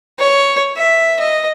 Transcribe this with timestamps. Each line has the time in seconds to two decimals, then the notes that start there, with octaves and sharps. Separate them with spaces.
0.19 C#5
0.76 E5
1.20 D#5